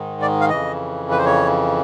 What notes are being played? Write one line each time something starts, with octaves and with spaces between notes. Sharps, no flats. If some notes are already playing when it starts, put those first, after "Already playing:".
Already playing: G#2 D#3
D5
F5
F2 C#3 E3 D#5
B4
C5
C#5